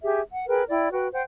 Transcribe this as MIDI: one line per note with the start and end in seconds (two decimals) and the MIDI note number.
0.02 0.20 67
0.02 0.20 68
0.02 0.20 76
0.32 0.43 78
0.48 0.62 68
0.48 0.62 70
0.48 0.62 71
0.48 0.62 79
0.69 0.91 64
0.69 0.91 74
0.69 0.91 79
0.91 1.07 66
0.91 1.07 71
0.91 1.07 79
1.12 1.21 72
1.12 1.21 78
1.12 1.21 79